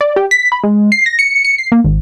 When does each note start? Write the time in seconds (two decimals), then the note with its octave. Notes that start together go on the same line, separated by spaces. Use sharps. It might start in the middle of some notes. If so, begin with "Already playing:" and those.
0.01 D5
0.16 G4
0.31 B6
0.52 B5
0.64 G#3
0.92 C7
1.06 A#6
1.19 C#7
1.45 C#7
1.58 C7
1.72 A#3
1.85 G#1